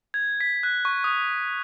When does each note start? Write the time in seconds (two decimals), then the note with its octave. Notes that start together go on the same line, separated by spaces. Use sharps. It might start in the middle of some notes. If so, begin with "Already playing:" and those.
0.14 G#6
0.41 B6
0.63 F#6
0.85 C#6
1.04 D#6